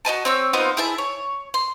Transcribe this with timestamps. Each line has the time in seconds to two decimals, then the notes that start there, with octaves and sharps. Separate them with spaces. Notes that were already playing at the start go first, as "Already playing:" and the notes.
0.05 F#4 D#5 G#5 A5
0.25 C4 C#5 E6
0.53 B3 D#4 F4 C5
0.77 E4 G#4 E5 A5
0.98 C#5
1.54 C6